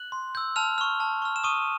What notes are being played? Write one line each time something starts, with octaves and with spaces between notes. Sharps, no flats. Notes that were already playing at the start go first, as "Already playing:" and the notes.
Already playing: F#6 F#7
C6
E6 G6
A5 F6 F7
C#6 F6
A5
C#6 F6
E7
C#6 D#6 D#7